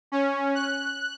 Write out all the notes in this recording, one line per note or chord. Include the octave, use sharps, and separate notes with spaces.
C#4
F#6